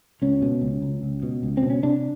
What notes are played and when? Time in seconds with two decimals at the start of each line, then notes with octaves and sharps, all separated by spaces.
0.22 C#2 C#4
0.42 B2
0.62 C#2
0.82 C#2
1.03 C#2
1.23 B2
1.43 C#2
1.57 C4
1.63 B2
1.70 C#4
1.83 C3 D4